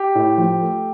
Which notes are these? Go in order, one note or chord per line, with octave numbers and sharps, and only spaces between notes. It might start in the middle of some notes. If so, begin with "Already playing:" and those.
Already playing: G4
A2
F3
A3